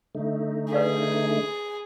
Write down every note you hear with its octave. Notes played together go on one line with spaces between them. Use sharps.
D3 A3 D#4
G#4 B4 D5 F5